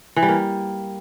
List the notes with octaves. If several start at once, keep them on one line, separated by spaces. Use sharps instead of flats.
E3
G3
A#3